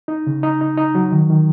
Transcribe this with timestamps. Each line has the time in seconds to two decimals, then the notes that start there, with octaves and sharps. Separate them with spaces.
0.08 D#4
0.27 C#3
0.43 D#4
0.61 D#4
0.77 D#4
0.95 F#3
1.12 D#3
1.30 D#3